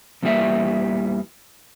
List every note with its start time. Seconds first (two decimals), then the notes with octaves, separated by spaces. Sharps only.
0.23 E2 A#2 E3 G3 A#3 E5